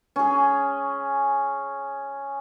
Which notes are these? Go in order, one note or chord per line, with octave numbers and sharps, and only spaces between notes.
C#4 G#4